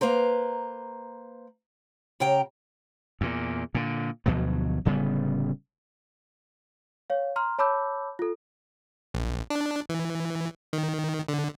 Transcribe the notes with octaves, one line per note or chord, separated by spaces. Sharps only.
A#3 B4 C5 A#5
C#3 G4 G5 A#5
E2 A#2
A#2 D3
D2 B2 F3 F#3
D1 C#3 G3 B3
C#5 F5
A#5 C6 F6
C#5 A5 B5 D6 E6 G6
F4 A4
A#1
D4
E3
D#3
D3